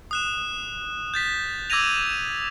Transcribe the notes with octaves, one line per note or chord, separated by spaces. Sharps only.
D#6 F#6 E7
G6 A6 B6
D6 E6 G#6 A#6 D#7 F7